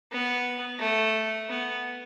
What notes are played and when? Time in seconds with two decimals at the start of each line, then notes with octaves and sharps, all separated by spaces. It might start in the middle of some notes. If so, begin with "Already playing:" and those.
0.12 B3
0.80 A3
1.49 B3